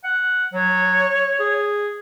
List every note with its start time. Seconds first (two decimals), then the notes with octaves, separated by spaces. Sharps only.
0.04 F#5
0.53 F#3 C#5
1.40 G#4